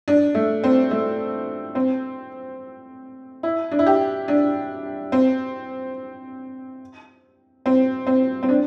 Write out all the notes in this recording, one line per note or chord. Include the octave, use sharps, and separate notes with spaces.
D4
A3
C4
A3
C4
E4
D4
E4
G4
D4
C4
C4
C4
C4
D4